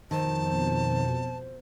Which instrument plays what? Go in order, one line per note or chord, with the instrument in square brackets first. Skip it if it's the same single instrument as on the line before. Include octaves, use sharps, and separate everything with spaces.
[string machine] F2 B2 [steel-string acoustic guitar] D#3 [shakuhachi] C5 [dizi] A5